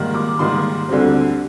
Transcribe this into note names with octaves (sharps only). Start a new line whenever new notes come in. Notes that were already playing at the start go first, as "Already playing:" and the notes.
Already playing: G#2 D#3 G3 A#3
D6
G#2 D#3 G3 A#3 C6
D2 D3 G3 C4